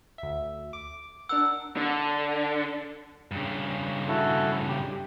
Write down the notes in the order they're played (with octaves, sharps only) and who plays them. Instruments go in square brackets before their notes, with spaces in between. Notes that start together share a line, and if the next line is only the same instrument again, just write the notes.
[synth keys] D2 E5
D6
[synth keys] D4 A#4 F#5 [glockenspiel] E6
[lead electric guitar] D3
G2 C#3
[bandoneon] E4 F#4 A4
G4